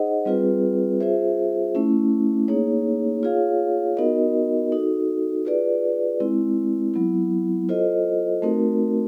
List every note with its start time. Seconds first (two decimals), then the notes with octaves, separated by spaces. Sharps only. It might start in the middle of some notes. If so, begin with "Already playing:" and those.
Already playing: D#4 G#4 C5 D#5 F#5
0.25 G3 C4 F4 G#4 B4
1.00 F4 G#4 C5 E5
1.75 A3 C#4 E4
2.48 A#3 D#4 G#4 C#5
3.23 F4 G#4 C#5 F5
3.97 B3 D#4 F#4 A#4 D#5
4.72 D#4 F#4 A4
5.45 F4 G#4 B4 D5
6.20 G#3 C4 E4
6.94 F#3 B3 E4
7.69 F4 A4 C5 D#5
8.42 A3 C4 D#4 F#4 A#4